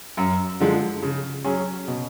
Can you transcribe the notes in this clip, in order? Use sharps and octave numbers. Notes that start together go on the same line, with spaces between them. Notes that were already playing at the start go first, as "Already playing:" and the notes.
F#2
D3 F3 G#3
C#3
F#3 C#4 G#4
B2